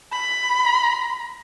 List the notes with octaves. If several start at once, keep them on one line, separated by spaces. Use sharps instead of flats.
B5